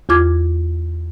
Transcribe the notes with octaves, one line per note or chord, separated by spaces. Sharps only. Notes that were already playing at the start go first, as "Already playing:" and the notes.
E2 F4 D6 G#6